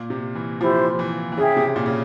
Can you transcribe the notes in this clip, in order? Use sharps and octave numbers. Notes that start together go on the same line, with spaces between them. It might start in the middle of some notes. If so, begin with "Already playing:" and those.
Already playing: A#2
C3
E3
F3 E4 G4 C5
E3
E3
C#3 G#4 E5 G5
C3
A#2
C#3